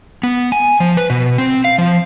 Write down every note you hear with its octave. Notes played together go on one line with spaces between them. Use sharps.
B3
G#5
F3
B4
B2
C4
F5
F3